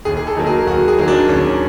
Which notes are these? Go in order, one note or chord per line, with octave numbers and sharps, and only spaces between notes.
D#2 G#4
G#4
A4
D#3 F#3 A#3
G#4
D#2 F#4
G#4
D#3 F#3 A#3
D4
D#2 C#4